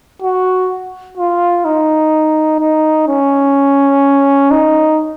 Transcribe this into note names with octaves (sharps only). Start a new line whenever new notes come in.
F#4
F4
D#4
D#4
C#4
D#4